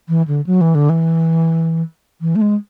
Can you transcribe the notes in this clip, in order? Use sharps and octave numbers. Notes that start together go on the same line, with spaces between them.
E3
D3
F#3
E3
D3
E3
E3
A3
G#3